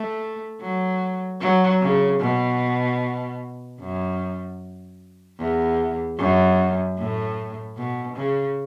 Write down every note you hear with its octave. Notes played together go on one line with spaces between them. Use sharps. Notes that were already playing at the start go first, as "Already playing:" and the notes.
Already playing: A3
F#3
F#3
C#3
B2
F#2
E2
F#2
A2
B2
C#3